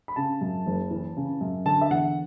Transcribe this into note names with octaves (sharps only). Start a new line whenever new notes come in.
B5
C#3 A5
F#2
F#1
E3
C#3
F#2
D3 A5
E5
E2 F#5